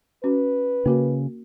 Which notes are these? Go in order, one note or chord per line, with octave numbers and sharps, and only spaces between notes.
C#4 F#4 B4
C#3 A#3 F#4 A#4